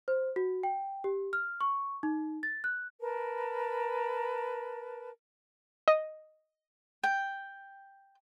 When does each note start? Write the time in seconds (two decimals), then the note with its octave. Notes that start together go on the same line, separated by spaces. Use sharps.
0.08 C5
0.36 F#4
0.63 G5
1.04 G4
1.33 F6
1.61 C#6
2.03 D#4
2.43 A6
2.64 F#6
3.00 A#4 B4 A5
5.88 D#5
7.03 G5